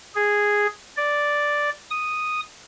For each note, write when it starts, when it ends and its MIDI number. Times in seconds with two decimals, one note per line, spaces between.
0.15 0.67 68
0.97 1.70 74
1.91 2.41 87